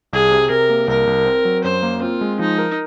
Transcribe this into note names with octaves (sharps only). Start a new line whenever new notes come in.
C2 G#4
C3
C3 A#4
A#3
C2 A#4
C2
C4
F#3
F#2 C5
A#3
C4 F4
G#3
F3 D#4
A#4